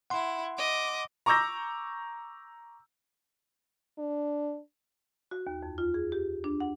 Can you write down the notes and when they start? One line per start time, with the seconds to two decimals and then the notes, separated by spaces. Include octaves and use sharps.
0.10 E4 F#5 C6
0.57 D#5 D6
1.26 A#5 C#6 D6 E6 G6 A#6
3.98 D4
5.31 F#4
5.47 D#2
5.63 F2
5.78 F4
5.94 G#4
6.12 G4
6.44 D4
6.60 F#5